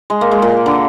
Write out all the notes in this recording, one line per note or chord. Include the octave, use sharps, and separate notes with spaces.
G#3
A#3
G#3
A#2
D3